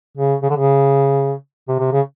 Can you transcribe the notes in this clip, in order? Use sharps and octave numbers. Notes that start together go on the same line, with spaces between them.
C#3
C#3
D3
C#3
C3
C3
C#3